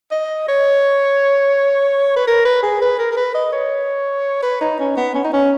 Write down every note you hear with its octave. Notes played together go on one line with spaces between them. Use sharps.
D#5
C#5
B4
A#4
B4
G#4
B4
A#4
A#4
B4
D#5
C#5
B4
D#4
C#4
B3
C#4
D#4
C#4